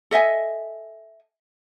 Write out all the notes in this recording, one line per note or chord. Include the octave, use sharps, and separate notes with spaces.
A4 D#5 E5 G#5